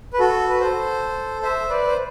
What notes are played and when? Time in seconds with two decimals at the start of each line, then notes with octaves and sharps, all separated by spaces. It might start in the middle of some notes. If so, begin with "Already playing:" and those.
0.13 B4
0.19 F#4 A4
0.50 B4
0.60 A4 C5
1.42 C5 E5
1.69 B4 D5
1.87 C5